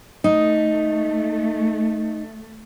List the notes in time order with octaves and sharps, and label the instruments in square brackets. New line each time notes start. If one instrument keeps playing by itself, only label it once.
[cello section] A3 [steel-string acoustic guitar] D#4